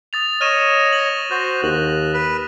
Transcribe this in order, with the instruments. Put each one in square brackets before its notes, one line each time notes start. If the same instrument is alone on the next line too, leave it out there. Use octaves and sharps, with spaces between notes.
[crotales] D#6 A6 F7
[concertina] C#5 D#5 [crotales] F6 D#7 E7
[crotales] A#6 F#7
[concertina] F#4 C5 F#6
[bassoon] D#2 [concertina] F#6
[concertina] B4